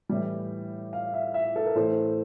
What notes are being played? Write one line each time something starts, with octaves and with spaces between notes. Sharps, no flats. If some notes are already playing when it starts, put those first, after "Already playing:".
A2 E3 G3
F5
E5
E5
A4
A#4
A2 E3 A3 C5